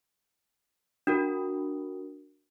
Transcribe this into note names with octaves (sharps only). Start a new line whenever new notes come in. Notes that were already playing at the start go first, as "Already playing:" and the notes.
D4 F#4 A#4